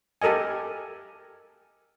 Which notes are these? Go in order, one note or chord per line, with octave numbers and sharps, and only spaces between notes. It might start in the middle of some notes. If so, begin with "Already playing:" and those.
G4 A4 A#4 D#5 G#5